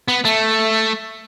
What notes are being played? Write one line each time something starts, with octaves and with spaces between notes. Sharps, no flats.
B3
A3